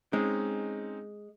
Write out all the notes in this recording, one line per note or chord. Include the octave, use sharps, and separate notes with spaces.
G#3 C4 C#4 D#4